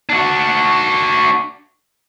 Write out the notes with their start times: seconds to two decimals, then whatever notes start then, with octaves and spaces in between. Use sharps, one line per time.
0.09 D4 F#4